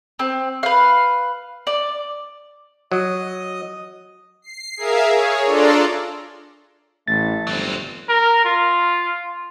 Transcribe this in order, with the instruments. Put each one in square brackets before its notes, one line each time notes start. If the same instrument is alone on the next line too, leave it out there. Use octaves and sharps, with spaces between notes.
[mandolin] C4
B4 F5
D5
[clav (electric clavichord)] F#3 [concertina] D#5
[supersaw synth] C7
G#4 A#4 E5 F5
G#4 C#5
D4 F4 A4 D5 A#5 C6
[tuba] A1 [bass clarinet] A3 [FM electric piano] A6
[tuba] G1 [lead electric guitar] F#3 C4
[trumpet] A#4
F4